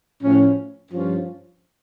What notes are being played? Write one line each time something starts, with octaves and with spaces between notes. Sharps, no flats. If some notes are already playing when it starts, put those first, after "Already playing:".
A2 F3 C#4
G2 F3 C#4 F4